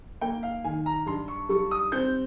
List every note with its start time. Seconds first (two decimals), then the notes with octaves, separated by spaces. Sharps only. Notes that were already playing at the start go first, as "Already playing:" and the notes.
0.21 A#3 G5
0.43 F5
0.64 D#3 G#5
0.86 A#5
1.06 G2 C6
1.28 C#6
1.49 G3 C#6
1.71 D#6
1.92 C4 G6